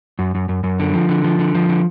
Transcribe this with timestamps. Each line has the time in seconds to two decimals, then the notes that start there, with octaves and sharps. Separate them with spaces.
0.19 F#2
0.35 F#2
0.49 F#2
0.64 F#2
0.80 D3
0.94 F3
1.09 D3
1.24 F3
1.39 D3
1.55 F3
1.69 D3